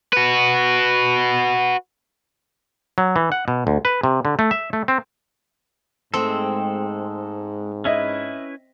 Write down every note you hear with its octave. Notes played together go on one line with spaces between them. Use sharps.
F#4 B4
F#3
E3
F#5
B2
D2
B4
C3
D3
A3
E5
A3
C4
G#2 G#3 A3 C4 A4
C#4 E4 B4 D#5 E5